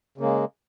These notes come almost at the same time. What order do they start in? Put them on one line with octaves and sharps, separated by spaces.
C#3 A#3 G#3